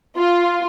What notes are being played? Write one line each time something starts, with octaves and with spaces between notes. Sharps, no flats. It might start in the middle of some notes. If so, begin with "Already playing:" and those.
F4